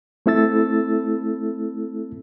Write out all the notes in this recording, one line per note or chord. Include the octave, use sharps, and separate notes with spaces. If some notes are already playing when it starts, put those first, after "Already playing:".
A3 C4 E4 A4 E6 A6